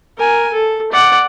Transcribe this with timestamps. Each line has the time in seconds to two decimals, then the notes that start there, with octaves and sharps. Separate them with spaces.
0.18 A#4 G#5
0.53 A4
0.92 D5 F#5